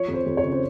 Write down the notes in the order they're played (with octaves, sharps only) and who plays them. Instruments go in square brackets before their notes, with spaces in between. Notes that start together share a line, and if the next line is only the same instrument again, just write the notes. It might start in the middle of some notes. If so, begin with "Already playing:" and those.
Already playing: [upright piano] F3 C#5
F2
C5
F2
C#5
C#3
C5